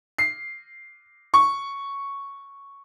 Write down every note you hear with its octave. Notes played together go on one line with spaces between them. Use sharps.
C7
C#6